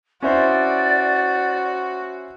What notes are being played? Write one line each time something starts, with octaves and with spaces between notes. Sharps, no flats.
C#4 E4 F#4 C5 D5